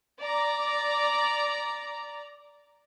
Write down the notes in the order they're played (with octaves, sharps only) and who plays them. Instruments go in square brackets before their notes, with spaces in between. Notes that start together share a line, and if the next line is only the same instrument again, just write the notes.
[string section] D5 A#5